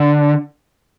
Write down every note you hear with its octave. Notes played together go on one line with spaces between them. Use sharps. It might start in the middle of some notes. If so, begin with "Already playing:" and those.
Already playing: D3